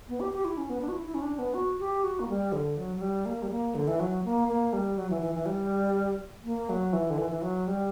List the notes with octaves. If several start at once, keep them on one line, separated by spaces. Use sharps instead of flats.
B3
G4
G4
E4
C#4
B3
D4
F#4
E4
E4
C#4
D4
B3
F#4
G4
F#4
A#3
G3
D3
F#3
F#3
G3
A#3
G3
A#3
D3
E3
F#3
A#3
A#3
G3
F#3
E3
E3
E3
G3
A#3
F#3
E3
D3
E3
E3
F#3
G3